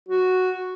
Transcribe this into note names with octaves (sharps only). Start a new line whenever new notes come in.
F#4